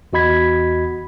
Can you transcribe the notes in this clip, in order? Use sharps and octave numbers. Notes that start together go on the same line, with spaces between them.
E2 F#4 D#5 B5 G#6 B6